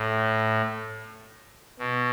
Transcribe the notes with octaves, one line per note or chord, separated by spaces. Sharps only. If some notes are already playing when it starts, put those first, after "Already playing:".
Already playing: A2
B2